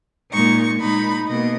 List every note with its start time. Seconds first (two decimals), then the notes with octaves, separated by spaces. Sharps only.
0.32 A#2 G#3 D#4 C#6
0.79 A#2 G#3 D#4 B5
1.27 B2 A#3 D#5